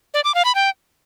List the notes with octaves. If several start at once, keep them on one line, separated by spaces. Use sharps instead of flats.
D5
D6
F5
B5
G5